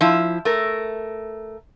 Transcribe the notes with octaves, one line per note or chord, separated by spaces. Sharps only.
F3 E4
A3 A#4